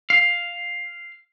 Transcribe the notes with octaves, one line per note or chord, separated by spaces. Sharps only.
F5